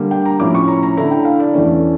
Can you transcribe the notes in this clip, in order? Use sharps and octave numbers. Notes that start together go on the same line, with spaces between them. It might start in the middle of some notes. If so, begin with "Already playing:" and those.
Already playing: D3 G3 A#3
G5
A#5
A2 F3 C#4 E4 D6
C#6
A#5
A#5
D3 A3 E4 A#5
G5
F5
D5
E2 E3 A3 C#4